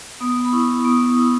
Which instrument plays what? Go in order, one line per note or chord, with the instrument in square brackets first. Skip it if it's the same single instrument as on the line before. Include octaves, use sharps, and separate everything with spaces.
[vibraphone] B3 D#6
B5
E4 C#6
B3 D#6
E4